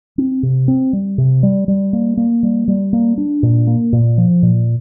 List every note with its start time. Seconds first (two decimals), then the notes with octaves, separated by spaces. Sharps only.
0.18 C4
0.43 C3
0.68 C4
0.93 G3
1.18 C3
1.43 G3
1.68 G3
1.93 A#3
2.17 A#3
2.43 G3
2.68 G3
2.93 A#3
3.18 D4
3.43 A#2
3.67 A#3
3.93 A#2
4.18 F3
4.43 A#2